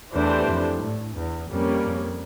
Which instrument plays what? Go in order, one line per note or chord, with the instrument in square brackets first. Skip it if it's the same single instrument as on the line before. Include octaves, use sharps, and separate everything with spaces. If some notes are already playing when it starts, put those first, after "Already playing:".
[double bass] E2 [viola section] E3 A3 D4 G4 C5
[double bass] F2
A2
E2
[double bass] F2 [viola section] G3 A#3 C#4
[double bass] F2